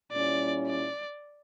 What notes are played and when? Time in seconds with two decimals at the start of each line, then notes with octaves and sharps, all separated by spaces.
0.12 A#2 G3 C#4 E4 D5
0.67 D5